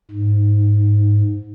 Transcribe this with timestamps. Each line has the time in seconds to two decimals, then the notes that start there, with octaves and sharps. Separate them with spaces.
0.11 G#2